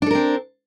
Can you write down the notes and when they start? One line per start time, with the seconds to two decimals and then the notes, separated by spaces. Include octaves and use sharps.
0.02 D4
0.06 A4
0.11 A#4
0.15 C4